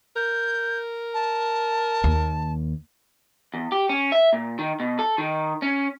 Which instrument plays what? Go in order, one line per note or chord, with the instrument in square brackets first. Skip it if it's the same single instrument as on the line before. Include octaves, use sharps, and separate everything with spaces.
[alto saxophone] A#4 [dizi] G6
[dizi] A5
[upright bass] D#2
[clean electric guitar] E2
G4
C#4
E5
A#2
D#3
B2
A4
D#3
C#4